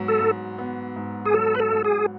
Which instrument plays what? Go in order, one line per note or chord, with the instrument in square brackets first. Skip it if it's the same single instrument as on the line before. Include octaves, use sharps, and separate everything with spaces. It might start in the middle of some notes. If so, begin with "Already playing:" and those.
Already playing: [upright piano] G#2 F#3 B3
[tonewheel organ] A4
[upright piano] G#2
B3
G#2
[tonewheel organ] G#4
[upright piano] F#3 [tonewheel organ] A4
[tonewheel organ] B4
A4
[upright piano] G#2
[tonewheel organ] G#4